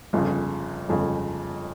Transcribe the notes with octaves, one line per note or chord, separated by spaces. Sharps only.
G1 F2 C#3
G1 F2 C#3